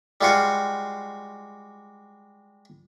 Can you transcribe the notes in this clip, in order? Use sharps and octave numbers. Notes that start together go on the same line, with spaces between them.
G3 G#3 F4 F#4 C5